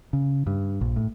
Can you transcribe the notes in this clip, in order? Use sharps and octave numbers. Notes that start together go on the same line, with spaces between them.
C#3
G2
A#1
A2